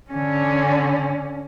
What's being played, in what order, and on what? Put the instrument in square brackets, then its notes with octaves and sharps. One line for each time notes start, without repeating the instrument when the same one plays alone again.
[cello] D3 C#4